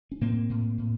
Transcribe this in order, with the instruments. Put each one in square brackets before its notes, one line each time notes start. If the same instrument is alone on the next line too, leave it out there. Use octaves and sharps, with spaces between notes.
[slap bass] C#4
A2 A#3 C4
A2
A2